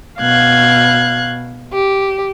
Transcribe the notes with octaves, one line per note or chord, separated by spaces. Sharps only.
B2 F5 F#6 G#6
G4